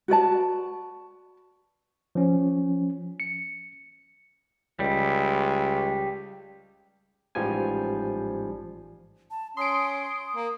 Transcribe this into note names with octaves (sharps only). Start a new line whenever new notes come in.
F#4 B4 D5 A5
F3 C#4
C#7
C#2 G3
A1 G#2 F3 G3 G#5
A5
C#4 C6 D#6 D7
A#3